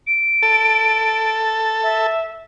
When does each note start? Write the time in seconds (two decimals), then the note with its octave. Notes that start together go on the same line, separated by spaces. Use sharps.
0.06 D7
0.43 A4
1.83 E5